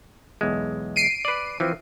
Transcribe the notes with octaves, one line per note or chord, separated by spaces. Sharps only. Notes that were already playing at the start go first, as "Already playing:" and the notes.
B1 E2 G#3
C7 D7 D#7
B4 D5
E3 F3 C4